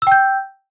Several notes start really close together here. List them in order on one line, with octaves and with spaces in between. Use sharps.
E6 G5 G6